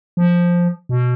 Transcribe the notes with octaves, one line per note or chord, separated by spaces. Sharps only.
F3
B2